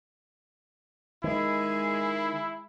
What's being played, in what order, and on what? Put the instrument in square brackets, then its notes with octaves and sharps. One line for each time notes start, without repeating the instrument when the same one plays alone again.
[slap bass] D#3 [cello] G#3 G#4 [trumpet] E4